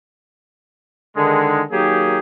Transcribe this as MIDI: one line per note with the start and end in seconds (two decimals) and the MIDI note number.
1.17 1.61 50
1.17 1.61 51
1.17 1.61 56
1.71 2.18 51
1.71 2.18 54
1.71 2.18 58
1.71 2.18 67
1.71 2.18 68